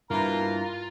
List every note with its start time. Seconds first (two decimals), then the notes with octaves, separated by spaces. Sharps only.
0.11 G2 B2 A#3 E4 F4 A#4 A#5